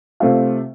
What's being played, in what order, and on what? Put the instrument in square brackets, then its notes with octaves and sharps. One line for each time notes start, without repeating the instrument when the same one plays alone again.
[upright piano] C3 A3 C4 F4 F5